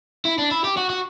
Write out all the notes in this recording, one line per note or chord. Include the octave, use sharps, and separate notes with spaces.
E4
D4
E4
G4
F#4
F#4